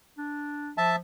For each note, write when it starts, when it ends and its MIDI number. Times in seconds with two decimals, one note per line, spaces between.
0.17 0.71 62
0.78 0.99 53
0.78 0.96 76
0.78 0.96 81